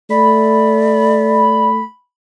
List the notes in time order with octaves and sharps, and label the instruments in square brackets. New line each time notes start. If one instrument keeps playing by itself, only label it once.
[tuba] A3 [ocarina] D5 [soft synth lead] B5